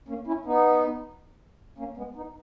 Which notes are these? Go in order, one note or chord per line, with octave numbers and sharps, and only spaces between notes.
A#3 C#4
C#4 E4
B3 D#4
A#3 C#4
G#3 B3
B3 D#4